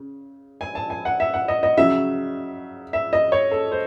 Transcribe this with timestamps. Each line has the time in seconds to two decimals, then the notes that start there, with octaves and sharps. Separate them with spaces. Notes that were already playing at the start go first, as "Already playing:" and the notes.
Already playing: C#3
0.61 G#5
0.75 A5
0.90 G#5
1.05 F#5
1.20 E5
1.34 F#5
1.48 D#5
1.63 D#5
1.77 C#3 F#3 E5
2.93 E5
3.13 D#5
3.32 C#5
3.51 A4
3.72 C5